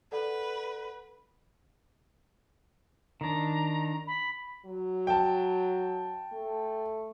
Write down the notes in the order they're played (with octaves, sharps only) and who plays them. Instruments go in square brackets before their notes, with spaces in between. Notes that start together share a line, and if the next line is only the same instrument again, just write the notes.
[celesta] A4 D5 F#5 [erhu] B4
[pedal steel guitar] D#3 D4 [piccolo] A#5
[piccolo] B5
[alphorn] F#3
[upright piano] G5 A5
[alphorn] A3